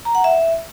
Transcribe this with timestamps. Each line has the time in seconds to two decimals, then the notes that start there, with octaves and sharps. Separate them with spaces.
0.05 A#5
0.15 F#5
0.24 E5